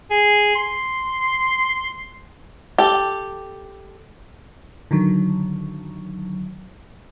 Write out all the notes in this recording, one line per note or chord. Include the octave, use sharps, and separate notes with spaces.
G#4
C6
G4 A4
D3 D#3 F#3